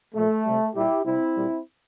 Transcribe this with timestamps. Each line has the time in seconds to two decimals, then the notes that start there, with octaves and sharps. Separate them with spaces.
0.14 A#2 F3 A3
0.45 C3 G3
0.75 A#2 G3 E4 G4
1.05 C3 G3 C4 E4
1.35 A#2 G3